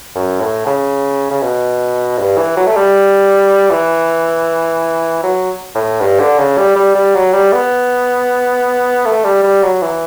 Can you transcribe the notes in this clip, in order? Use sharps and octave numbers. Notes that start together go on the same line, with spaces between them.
F#2
A2
C#3
C#3
B2
G2
E3
F#3
A3
G3
E3
F#3
A2
G2
D3
C#3
G3
G3
G3
F#3
G3
B3
A3
G3
G3
F#3
E3